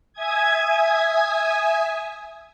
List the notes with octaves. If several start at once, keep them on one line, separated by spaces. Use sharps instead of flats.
E5 G#5 D#6 G#6